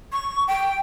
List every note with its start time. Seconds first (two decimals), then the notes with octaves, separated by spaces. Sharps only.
0.13 C#6
0.48 G5